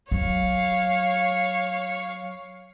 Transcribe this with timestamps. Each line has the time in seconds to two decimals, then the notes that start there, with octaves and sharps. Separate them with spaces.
0.11 F#3 C#5 F5